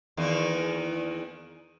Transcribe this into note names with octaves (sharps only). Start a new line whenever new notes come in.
E2 D#3 A#3